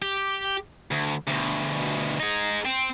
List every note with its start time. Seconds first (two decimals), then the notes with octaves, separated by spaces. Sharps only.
0.02 G4
0.91 D2
1.27 D2 B2
2.20 D#4 G#4
2.65 C4